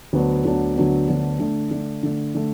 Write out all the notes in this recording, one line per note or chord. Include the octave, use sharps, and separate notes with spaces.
D2 D3 F#3 B3 D4
D2 D3 F#3 B3 D4
D2 D3 F#3 B3 D4
D2 D3 F#3 B3 D4
D3 A3 D4
D3 A3 D4
D3 A3 D4
D3 A3